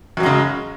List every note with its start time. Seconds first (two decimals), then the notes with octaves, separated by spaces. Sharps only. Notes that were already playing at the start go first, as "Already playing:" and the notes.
0.17 F#2
0.20 F#3
0.23 G#3
0.26 C#3